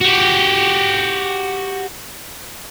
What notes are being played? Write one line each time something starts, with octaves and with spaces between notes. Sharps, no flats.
F#4 G4